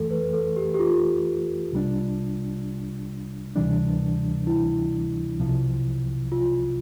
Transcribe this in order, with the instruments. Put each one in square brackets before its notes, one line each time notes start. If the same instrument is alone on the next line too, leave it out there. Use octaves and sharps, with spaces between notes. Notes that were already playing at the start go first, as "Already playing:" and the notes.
Already playing: [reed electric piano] F2 E3 A3 [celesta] A4
[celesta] B4
A4
G4
G4
F4
[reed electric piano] C2 C3 G3 D4
D2 C3 E3 G3 D4
[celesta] E4
[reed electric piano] C2 C3 F3
[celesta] F4